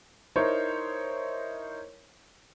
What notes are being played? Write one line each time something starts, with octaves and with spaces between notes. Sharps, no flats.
D#4 E4 A#4 C5 C#5